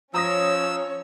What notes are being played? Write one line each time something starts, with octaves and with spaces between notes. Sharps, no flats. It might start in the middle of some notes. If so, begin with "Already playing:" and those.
F3 C#4 C#5 A#5 D#6 E6 A#6